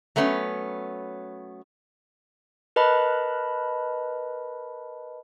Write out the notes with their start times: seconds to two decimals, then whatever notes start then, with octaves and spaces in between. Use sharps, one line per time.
0.16 F#3 A3 B3 C#4
2.76 A#4 B4 D#5 A5 B5